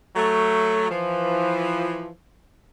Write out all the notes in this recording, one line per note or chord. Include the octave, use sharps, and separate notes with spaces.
F#3 A3
E3 F3